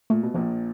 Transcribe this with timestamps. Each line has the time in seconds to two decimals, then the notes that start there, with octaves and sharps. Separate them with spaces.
0.10 A#2 A3
0.23 B2
0.34 A#1 A#2 F3